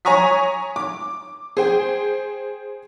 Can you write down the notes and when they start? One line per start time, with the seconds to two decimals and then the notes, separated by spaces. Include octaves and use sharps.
0.05 C#5 G#5 A#5 C#6 D#6 B6
0.76 D6
1.57 G#4 C5 G5